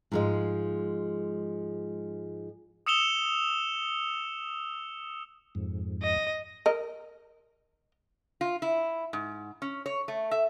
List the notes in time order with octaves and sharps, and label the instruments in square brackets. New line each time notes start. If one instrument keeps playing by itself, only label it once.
[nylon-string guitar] G#2 F3 G#3
[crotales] D#6 E6 C#7 E7 F7 G7
[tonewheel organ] F2 G#2
[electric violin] D#5
[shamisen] A#4 D#5
[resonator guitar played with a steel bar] F4
E4
G#2
C#4
C#5
A3
E5